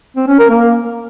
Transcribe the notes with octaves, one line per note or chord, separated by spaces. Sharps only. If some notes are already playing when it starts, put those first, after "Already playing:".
C4
C#4
A#4
A#3